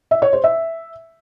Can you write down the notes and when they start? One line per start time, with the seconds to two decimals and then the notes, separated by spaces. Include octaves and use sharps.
0.11 E5
0.22 C#5
0.33 C5
0.44 E5